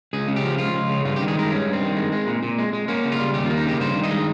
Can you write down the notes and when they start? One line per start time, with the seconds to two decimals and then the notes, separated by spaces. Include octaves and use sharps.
0.13 C#2 G#4
0.28 C#3
0.36 G4
0.44 F3
0.58 C#2 F4
0.74 C#2
0.89 C#3
1.05 G2 F4
1.16 D#3 G4
1.28 G#4
1.36 G#3 A#4
1.51 G2 C#4
1.66 G2
1.73 C4
1.81 D#3
1.97 G#3
2.12 G#3
2.27 A#2
2.43 A#2
2.58 G#3
2.73 G#3
2.88 A#3 C#4
3.04 C#3
3.12 F4
3.20 G3
3.34 D#2 G4
3.46 A#3 F4
3.57 D#4
3.65 C#3 G4
3.80 G2 C5
3.96 D#3
4.04 D#5
4.11 G#3